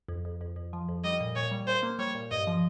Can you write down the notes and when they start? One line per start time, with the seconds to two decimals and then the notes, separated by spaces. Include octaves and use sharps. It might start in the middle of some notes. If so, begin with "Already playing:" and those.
0.09 F2
0.25 F2
0.41 F2
0.56 F2
0.73 F3
0.89 F2
1.04 G3 D#5
1.21 A#2
1.36 A#2 C#5
1.51 G3
1.67 A#2 C5
1.83 A#3
1.99 G3 C#5
2.15 A#2
2.31 G2 D#5
2.47 F3